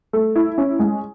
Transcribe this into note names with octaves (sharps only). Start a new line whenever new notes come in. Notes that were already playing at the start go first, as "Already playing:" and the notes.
A3
E4
C#4
G#3